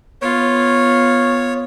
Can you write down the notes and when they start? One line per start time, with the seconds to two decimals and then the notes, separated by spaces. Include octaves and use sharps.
0.22 B3 F4 C#5